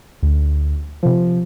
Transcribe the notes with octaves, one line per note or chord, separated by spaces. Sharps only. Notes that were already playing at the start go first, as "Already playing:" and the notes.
D2
C3 F3